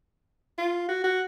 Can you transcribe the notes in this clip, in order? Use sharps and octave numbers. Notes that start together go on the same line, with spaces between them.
F4
F#4
F#4